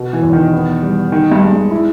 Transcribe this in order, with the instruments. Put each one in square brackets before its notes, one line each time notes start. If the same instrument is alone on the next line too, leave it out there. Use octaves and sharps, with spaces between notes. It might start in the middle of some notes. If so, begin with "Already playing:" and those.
Already playing: [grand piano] B2
[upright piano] E3
[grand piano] E2
[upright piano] D#3
[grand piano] B3
G3
[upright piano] D#3 [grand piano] D#4
[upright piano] G2
[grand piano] G#3
[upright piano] G2
[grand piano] E4